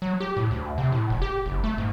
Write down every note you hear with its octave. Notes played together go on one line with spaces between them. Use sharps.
F#3
G4
A2
D2
C3
A2
F1
G4
F#1
A3
G#2